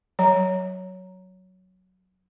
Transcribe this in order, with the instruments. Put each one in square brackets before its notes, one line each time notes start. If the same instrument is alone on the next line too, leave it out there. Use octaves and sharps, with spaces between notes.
[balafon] F#3 C#5 A#5